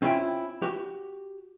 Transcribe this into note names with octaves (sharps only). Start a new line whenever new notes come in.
C4 C#4 E4 F4 E5 G5
F#4 G4